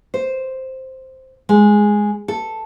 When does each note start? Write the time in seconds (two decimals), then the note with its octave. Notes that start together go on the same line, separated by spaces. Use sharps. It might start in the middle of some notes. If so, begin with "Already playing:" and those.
0.14 C5
1.49 G#3
2.28 A4